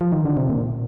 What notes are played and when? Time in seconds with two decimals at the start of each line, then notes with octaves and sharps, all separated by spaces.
0.01 F3
0.12 D#3
0.25 D3
0.37 C3
0.49 A#2